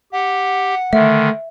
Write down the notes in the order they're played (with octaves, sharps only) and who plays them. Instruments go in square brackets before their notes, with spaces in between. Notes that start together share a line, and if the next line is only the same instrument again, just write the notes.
[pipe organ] G4 [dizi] F#5
[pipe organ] D3 D#3 [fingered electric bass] A3 [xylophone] E5